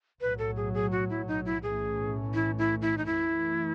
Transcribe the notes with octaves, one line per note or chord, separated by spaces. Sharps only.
B1 A2 F#3 B4
A4
G#4
G#4
F#4
E4
D#4
E4
B1 A2 E3 A3 C#4 G#4
E4
E4
E4
D#4
F#2 E3 A3 E4